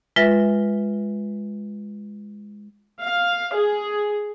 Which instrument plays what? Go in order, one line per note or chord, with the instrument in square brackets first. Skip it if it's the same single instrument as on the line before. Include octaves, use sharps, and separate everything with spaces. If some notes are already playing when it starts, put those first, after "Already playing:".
[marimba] G#3 F4 B4 E5 A6 A#6
[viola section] F5
G#4